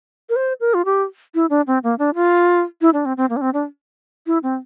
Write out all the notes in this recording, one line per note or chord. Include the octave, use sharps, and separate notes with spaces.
A#4
C5
A#4
F4
G4
E4
D4
C4
A#3
D4
F4
E4
D4
C4
C4
A#3
D4
C4
D4
E4
C4